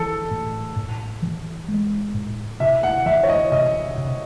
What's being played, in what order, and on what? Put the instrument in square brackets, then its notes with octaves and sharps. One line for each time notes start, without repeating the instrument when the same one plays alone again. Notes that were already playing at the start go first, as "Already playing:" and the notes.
Already playing: [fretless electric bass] E3 [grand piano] A4
[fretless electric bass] A2
A2
E3
G#3
A2
[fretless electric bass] C3 [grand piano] E5
[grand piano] F#5
[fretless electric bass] E3 [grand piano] E5
[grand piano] C#5
D#5
[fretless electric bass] C3 [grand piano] D#5
[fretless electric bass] C3